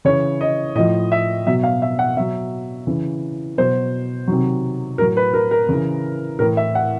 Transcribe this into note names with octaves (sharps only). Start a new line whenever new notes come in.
C#3 E3 C#5
D#5
A2 F3 D#5
E5
B2 F#3 E5
F5
E5
F#5
B2 F#3 E5
C#3 E3
B2 F#3 C5
C3 D#3 F#3
A2 F#3 A#4
B4
A#4
A#4
C#3 E3
A2 E3 A#4
E5
F#5